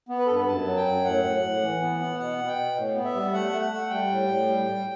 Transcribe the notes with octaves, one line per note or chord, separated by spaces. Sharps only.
B3
B4
G2 A4
B4
F#2 A5
F#3
G5
F#2
A2 F#5
A2
A2
E3
B3
B3
B2 F#5
B2
G5
B2
A2
B3
E5
G3
A3 F#5
A3
F#5
A3
G3 G5
A2
A2
G3
G3